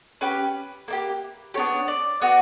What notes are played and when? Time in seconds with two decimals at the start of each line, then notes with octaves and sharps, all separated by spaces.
0.21 C#4 G4 B4
0.88 A#3 D4 G4
1.54 B3 D4 G4 C#5
1.88 D5
2.22 B3 F#4